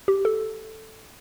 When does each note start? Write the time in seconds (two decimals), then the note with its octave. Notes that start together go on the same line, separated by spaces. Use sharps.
0.08 G4
0.25 A4